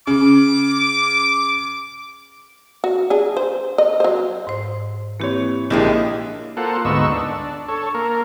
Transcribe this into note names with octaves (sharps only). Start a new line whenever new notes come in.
C#3 D6
F#4
D4 G#4
C5
D#5
F#3 C5
G#2 C5
E3 A#3 C4 G4 C#5
A#1 G#3 A#3 D4 E4 G4 G#4 G5
A#3 F4 A4 C5 F#5
D2 G#2 B3 D#4 C#6 E6
D4
A4 C#5
A#3 A#4